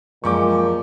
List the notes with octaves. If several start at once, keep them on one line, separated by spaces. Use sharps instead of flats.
F#2 A#2 F3 G#3 C#6 D6